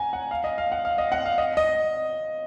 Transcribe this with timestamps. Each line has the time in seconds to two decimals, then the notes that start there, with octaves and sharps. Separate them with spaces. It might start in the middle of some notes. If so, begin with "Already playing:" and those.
Already playing: F#5 G#5 A#5
0.13 F#5
0.31 F5
0.44 D#5
0.58 F5
0.72 F#5
0.85 F5
0.98 D#5
1.12 F#5
1.26 F5
1.38 D#5
1.57 D#5